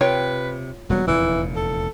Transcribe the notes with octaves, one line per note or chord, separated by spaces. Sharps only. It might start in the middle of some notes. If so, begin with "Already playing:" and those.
C3 F4 B4 C#5 G5
E1 F#3 G3 B3
F1 E2 A#2 E3
A4